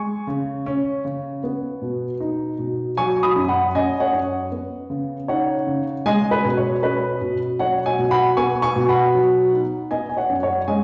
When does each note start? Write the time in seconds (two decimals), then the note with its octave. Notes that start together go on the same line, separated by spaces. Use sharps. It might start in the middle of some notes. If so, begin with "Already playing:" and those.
Already playing: G#3 G#5 C#6
0.27 C#3
0.66 C#4
1.05 C#3
1.44 B3
1.82 B2
2.20 D#4
2.59 B2
2.97 F#3 G#5 C#6
3.23 B5 D#6
3.36 F#2
3.48 F#5 B5
3.75 C#4 D#5 G#5
4.00 C#5 F#5
4.13 F#2
4.52 B3
4.90 C#3
5.28 D#4 C#5 F#5
5.67 C#3
6.06 G#3 D#5 G#5
6.31 B4
6.45 B2
6.57 C#5
6.83 C#4 B4 D#5
7.22 B2
7.59 F#3 C#5 F#5
7.85 D#5 G#5
7.99 B2
8.11 F#5 B5
8.37 B3 G#5 C#6
8.62 G#5 C#6
8.76 B2
8.89 F#5 B5
9.15 F#3
9.53 D#4
9.91 B3 D#5 G#5
10.09 G#5
10.17 C#5 F#5
10.29 F#2
10.43 C#5 F#5
10.68 G#3 D#5 G#5